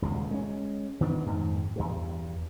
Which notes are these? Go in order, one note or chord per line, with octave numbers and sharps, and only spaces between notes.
D#1 C#2 B2
G#3 C#4
D#3 B3 C#4 D4
F2 G#2 D#3
E2 G2